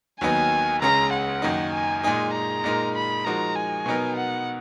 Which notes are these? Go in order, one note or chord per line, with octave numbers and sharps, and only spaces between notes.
D#2 D#3 F#3 B3 D#4 G#5
C#2 C#3 G#3 C#4 A#5
F#5
F#2 D#3 A#3 D#4
G#5
A#2 G#3 D#4 G#4 G#5
A#5
A#2 G#3 D#4 A#4
B5
F3 G#3 D#4 F#4 A#4 A#5
G#5
B2 F#3 B3 D#4 A#4
F#5